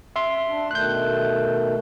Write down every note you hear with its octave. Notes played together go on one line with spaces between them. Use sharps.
E5 C6
D4
B2 D#3 A3 F#6 G6